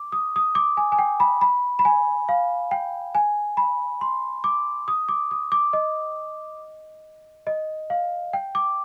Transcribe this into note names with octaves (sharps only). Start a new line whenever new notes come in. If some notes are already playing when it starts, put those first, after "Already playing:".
Already playing: D6
D#6
D#6
D6
G#5
G#5
G5
B5
B5
B5
G#5
F5
G5
G#5
B5
C6
D6
D#6
D6
D#6
D6
D#5
D#5
F5
G5
D6